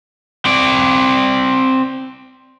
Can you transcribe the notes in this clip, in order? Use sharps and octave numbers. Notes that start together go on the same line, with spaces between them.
C4 D5